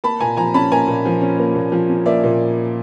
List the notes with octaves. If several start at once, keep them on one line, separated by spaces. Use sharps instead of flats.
A#3 A5 B5
A#2 G#5 A#5
F3 G#5 A#5
C#4 A5 B5
A#3 G#5 A#5
A#2
F3
C#4
A#3
A#2
F3
C#4
A#3 D5 E5
A#2